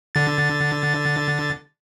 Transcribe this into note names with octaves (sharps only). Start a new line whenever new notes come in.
D3 A6